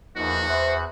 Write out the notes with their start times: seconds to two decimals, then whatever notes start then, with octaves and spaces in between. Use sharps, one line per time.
0.16 E2 F3 A#3 D#4 F#4 F#6
0.48 C5 E5